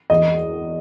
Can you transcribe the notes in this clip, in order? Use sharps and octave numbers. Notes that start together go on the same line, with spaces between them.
E2 D#5